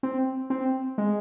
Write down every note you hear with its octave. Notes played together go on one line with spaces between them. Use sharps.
C4
C4
G#3